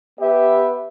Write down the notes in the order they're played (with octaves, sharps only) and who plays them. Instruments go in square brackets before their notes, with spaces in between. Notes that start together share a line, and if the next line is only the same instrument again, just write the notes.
[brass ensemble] B3 G4 B4 E5